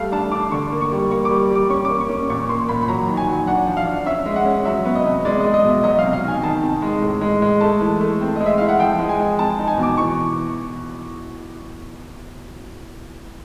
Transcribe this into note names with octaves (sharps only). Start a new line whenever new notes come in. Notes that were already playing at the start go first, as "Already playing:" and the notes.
Already playing: G3 A3 F5
D4 A5
D4 D6
D3 C#6
A#3
C#6
G3
A#3 C#6
D6
G3
G3
D6
C#4 C#6
A#3 D6
C#6
C#4
A#2 C#6
A#3 C6
A#2 B5
B5
F#3 A#5
D#3
G#5
F#3
D4 F#5
F3
F5
D4
C#4 E5
G#3
F#5
C#4
F#3 E5
B3
D#5
C3
G#3 D5
G#3 D#5
D#5
B2 E5
F#3 D#5
C3 F5
F5
D#3 G#5
D#3 A5
C3
G#3
A2
G#3
G#3
A3 A5
E3
A3
C4
G#3 D#5
E5
E4 F5
F#5
F3 G5
G#3
G#5
G#3
C4 A5
D#4
G#5
B2
D6
E3 C#6